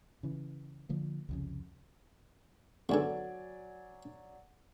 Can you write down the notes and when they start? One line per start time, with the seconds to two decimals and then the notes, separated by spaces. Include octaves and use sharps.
0.23 C#3 E3
0.89 D3 F3 A#3
1.29 C2 F2 C#3
2.89 E2 G#2 D3 F#3 D5 G#5